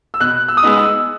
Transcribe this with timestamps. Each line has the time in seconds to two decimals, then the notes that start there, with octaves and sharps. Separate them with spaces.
0.14 E6
0.20 B2 F#6
0.48 E6
0.57 D#6
0.63 G#3 B3 D#4 E6
0.77 E6